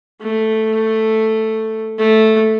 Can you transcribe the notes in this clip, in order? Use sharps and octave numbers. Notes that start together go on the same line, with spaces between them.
A3
A3